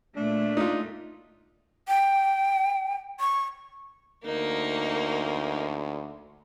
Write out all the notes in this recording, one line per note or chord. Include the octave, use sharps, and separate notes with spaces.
A#2 A3 D4
D#4 F4
G5
C#6
D2 A#3 D#4